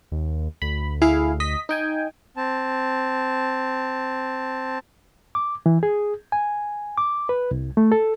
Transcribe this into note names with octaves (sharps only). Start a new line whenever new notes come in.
D#2
D2 B5
E4 G#4 F5
D#5 B6
D#4 G5 G#5
C4 A5
D6
E3
G#4
G#5
D6
B4
C2
A3
A4